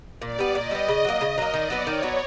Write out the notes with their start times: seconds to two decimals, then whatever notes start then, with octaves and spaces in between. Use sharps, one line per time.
0.21 A#2 D5
0.39 G3 B3
0.55 A#2 D#5
0.71 G3 B3
0.88 C#3
1.05 F#3 A#3
1.20 C#3 D#5
1.38 F#3 A#3
1.54 D#3 D5
1.70 F#3 B3
1.86 D#3 C#5
2.03 F#3 B3